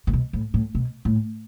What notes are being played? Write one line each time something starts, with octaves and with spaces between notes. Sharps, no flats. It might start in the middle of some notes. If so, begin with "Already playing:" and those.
A2
B2
A2
A2
B2
A2